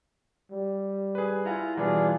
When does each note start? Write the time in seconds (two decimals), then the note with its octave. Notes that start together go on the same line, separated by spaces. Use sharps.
0.51 G3
1.15 G#4 B4
1.45 E4 F4 F#5 G#5 A#5
1.77 B2 E3 G3 D4 F4 G#4